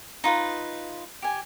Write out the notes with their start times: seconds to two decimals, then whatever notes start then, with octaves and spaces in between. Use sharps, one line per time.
0.24 D#4 F4 B4
1.22 G4 G#5